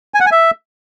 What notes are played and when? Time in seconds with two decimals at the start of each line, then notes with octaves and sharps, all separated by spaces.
0.14 G#5
0.20 F#5
0.26 G#5
0.32 E5